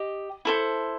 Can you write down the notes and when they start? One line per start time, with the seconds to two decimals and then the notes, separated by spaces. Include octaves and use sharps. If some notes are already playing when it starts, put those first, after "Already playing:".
Already playing: G4 D#5
0.45 E4 A4 C5